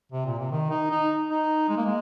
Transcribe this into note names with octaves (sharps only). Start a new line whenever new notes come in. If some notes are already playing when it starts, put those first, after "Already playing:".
C3
A#2
C3
D#3
D#4
D#4
D#4
G#3
A#3
G#3